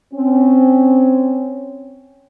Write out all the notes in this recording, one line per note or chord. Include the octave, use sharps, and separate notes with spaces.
C4 C#4